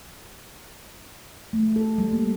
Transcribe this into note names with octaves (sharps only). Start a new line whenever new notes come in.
A3
A4
G3
A#3